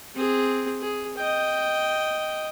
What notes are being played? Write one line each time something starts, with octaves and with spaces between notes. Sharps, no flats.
C4 G#4
G#4
D#5 G5